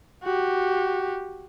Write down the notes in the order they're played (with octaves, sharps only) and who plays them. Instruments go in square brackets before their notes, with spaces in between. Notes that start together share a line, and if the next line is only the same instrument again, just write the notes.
[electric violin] F#4 G4